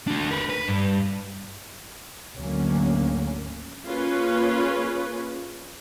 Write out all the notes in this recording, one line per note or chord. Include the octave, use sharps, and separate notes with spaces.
D4 F#4
A#4 B4
B4
G2
D2 G#2 D3 F#3 A#3 C#4
A#3 C#4 F4 G#4 B4